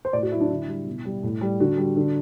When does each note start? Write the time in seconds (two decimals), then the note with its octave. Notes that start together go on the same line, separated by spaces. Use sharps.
0.05 C5
0.13 A2 D5
0.23 F#4
0.31 A3 E4
0.35 F#3
0.41 D4
0.50 D3 E4
0.68 G3
0.86 B2
1.05 G3
1.23 A2
1.41 G3
1.60 D3 F#4
1.78 G3
1.96 D3